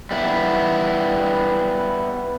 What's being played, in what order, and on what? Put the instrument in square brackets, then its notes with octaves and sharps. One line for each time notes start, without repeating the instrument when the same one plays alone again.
[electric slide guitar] G3 B3 E4